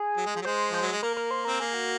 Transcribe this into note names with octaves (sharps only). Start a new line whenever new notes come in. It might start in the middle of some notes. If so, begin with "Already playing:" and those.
Already playing: G#4
F#3
G#3
F3
F#3
G#3 C5
F3 C5
F#3
G#3
A#3 A#4
A#4
C5
C4 A#4
A#3 G#4
F#4